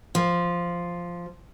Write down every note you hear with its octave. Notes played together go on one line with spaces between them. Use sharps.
F3